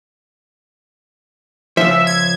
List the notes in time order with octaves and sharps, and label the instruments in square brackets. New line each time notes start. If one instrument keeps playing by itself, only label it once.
[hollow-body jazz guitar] C#2 F3 [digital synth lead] E5
[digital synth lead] G#6